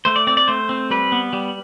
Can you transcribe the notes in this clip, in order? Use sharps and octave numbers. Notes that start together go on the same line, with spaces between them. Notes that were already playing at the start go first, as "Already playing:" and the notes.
A3 C5
D5
C4 D5
D5
A3 C5
C4
G3 B4
B3
G3